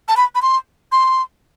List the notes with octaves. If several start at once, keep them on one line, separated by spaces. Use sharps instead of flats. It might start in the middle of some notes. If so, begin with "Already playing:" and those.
A5
B5
B5
C6
C6